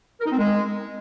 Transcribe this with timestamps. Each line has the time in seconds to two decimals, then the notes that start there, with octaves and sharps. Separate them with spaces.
0.20 A#4
0.26 D#4
0.32 C4
0.38 G#3